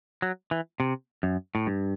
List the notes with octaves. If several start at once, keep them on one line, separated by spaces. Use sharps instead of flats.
F#3
E3
C3
F#2
A2
G2